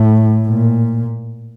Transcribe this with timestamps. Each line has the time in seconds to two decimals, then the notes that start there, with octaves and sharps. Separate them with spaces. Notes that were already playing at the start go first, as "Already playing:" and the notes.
Already playing: A2
0.48 A#2